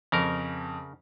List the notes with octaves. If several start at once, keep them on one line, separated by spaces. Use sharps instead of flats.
F2 C#3 A#4